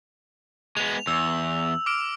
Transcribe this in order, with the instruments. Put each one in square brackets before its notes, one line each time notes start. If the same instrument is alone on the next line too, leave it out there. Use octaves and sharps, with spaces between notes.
[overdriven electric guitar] G#3 B3 [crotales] F7
[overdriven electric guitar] E2 [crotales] E6
[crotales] D6 F6 D7